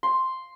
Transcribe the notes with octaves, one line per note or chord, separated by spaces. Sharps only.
C6